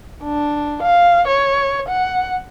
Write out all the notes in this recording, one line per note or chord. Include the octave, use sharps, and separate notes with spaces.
D4
F5
C#5
F#5